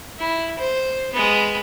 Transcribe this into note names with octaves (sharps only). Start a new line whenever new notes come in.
E4
C5
G#3 B3